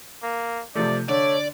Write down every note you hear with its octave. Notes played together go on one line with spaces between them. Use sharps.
A#3
C3 F3 A3 D5
D3 A3 C#5 D5